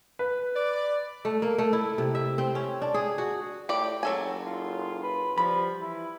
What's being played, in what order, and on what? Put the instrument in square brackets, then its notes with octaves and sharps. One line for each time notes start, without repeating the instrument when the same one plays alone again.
[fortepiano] B4
[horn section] D5
[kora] A3
A#3
A3
E4
C3
E5
C4
C#4
D4
G#4
F#4
[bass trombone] A2 [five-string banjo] G4 D5 [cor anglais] G5
[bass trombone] F#1 [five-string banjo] F#3 A4 G#5
[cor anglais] F4
B4
[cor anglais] F3 [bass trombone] G3 [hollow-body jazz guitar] B5
[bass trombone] E3 [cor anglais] E4